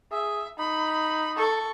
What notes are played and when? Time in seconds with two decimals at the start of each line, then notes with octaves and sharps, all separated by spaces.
0.12 G#4 E5
0.59 D#4 B5
1.36 A4 C#6